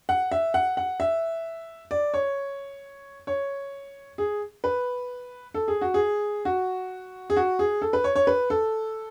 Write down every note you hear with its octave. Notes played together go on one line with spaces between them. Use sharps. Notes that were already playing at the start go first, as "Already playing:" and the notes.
F#5
E5
F#5
F#5
E5
D5
C#5
C#5
G#4
B4
A4
G#4
F#4
G#4
F#4
G#4
F#4
G#4
A4
B4
C#5
C#5
B4
A4